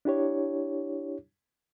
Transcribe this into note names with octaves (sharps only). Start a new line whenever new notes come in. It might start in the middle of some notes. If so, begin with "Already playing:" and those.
D4 E4 G4 C#5